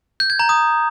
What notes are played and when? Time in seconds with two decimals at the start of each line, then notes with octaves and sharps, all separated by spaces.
0.20 G6
0.30 G#6
0.39 A#5
0.49 D#6